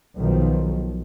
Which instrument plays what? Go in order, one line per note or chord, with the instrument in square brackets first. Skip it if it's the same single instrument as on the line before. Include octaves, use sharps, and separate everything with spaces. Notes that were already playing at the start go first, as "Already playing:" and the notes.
[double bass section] B1 D#3 F3